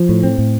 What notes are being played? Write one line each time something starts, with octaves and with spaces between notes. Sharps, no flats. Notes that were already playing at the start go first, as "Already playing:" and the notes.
Already playing: F3
A2
C4
A2